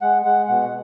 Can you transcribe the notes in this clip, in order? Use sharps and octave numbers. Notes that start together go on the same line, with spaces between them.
G#3 F#5
G#3 F#5
B2 F#5